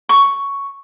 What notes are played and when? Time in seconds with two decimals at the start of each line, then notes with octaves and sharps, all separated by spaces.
0.09 C#6